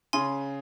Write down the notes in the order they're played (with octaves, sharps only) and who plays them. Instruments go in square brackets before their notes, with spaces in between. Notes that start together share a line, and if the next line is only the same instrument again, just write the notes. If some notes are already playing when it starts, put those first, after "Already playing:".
[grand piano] C#3 [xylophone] G#5 C6